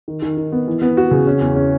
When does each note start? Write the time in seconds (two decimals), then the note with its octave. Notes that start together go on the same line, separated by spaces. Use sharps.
0.08 D#3
0.22 D#3
0.37 D#3
0.52 B3
0.68 E3
0.82 B3
0.97 F#4
1.11 C#3
1.27 C#4
1.41 E2
1.56 C#4